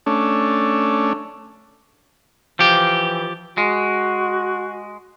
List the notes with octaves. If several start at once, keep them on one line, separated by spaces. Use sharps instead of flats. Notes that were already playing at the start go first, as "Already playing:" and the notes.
A3 C#4 D4
E3 F3 G4
G#3 F#4